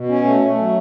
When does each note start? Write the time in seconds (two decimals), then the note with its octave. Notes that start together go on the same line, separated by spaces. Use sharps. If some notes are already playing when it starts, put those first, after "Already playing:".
Already playing: B2
0.09 C#4
0.25 A3
0.41 A3
0.58 F#3